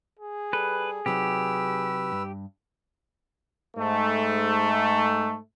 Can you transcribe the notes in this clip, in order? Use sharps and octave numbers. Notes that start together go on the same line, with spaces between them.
G#4
G3 A4 B4
C3 F#3 D#4 G4 B4 E6
G2
G#2 A3